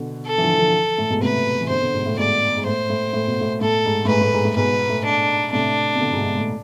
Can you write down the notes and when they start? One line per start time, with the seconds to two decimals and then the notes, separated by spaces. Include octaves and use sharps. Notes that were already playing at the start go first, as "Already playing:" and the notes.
Already playing: B2 D3
0.27 A4
0.38 E3
0.42 D3 F3
0.58 D3 F3
0.98 A2
1.10 G#2 B2
1.22 A2 C3 B4
1.60 E3
1.69 B2 D3 C5
1.82 B2 D3
1.94 G#2 B2
2.06 A2
2.18 G#2 B2 D5
2.57 G#2
2.66 A2 C5
2.90 A2
3.13 A2
3.27 B2
3.41 A2
3.61 A2 A4
3.85 G#2
4.05 A2
4.09 G#2 B4
4.21 A2
4.33 G#2
4.45 A2
4.56 G#2 B2 B4
4.89 A2
5.04 D4
5.52 A2 C3 D4
5.95 C3
6.00 B2 D3
6.12 G#2 B2
6.24 G#2 B2
6.36 A2